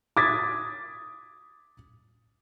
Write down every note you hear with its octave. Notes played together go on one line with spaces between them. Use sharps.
D6 D#6 G#6 A6 B6